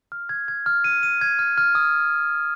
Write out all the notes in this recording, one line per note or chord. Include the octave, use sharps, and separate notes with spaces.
F6
G#6
G#6
F6
D#7
D#7
G#6
F6
F6
D#6